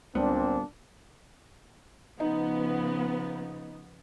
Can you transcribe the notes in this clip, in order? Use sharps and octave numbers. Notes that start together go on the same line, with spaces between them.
D1 C#2 A#2 G3 B3 C4 D4
C#3 F3 B3 D#4